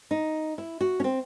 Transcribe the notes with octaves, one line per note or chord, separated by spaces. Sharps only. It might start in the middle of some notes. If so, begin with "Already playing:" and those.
D#4
E4
F#4
C#4
C4